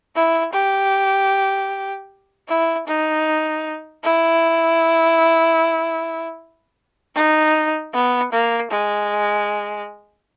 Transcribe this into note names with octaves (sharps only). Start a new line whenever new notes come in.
E4
G4
E4
D#4
E4
D#4
B3
A#3
G#3